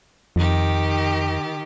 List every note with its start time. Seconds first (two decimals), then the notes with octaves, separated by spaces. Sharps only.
0.36 F2 D#3 G4